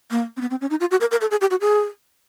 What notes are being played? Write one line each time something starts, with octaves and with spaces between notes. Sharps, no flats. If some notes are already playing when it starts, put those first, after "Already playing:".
A#3
C4
B3
C4
C#4
D#4
F4
F#4
A#4
A#4
A4
G#4
G4
F#4
G#4